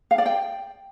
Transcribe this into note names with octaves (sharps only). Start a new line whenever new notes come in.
F5
D5
G5